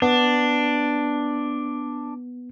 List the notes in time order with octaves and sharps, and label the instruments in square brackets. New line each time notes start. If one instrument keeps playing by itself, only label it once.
[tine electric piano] B3 [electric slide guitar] D4